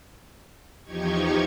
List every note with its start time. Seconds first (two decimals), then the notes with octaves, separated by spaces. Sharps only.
0.84 E2 F3 D#4 G4 C#6 G#6